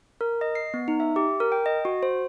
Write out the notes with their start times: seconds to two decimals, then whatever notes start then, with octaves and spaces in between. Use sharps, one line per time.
0.21 A#4
0.41 D#5
0.55 C7
0.74 B3
0.88 D#4
1.00 E5
1.16 G4
1.40 A#4
1.52 G5
1.66 D#5
1.85 F#4
2.03 C5